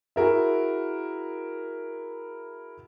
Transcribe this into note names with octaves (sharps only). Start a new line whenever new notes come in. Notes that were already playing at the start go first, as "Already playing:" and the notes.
E4 F#4 G#4 A#4 E5